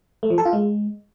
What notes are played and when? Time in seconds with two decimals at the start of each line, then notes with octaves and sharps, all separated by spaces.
0.23 A3
0.30 F3
0.38 A4
0.45 F4
0.53 G#3